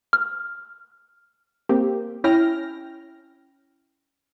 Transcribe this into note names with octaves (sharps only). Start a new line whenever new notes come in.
F6
A#3 C4 G4
C#4 E4 G5 F6 A#6